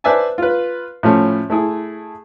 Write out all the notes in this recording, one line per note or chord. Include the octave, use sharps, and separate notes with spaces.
B4 C5 D5 E5 G#5 A5
F4 B4
A2 F3 A3 C#4
A3 E4 G#4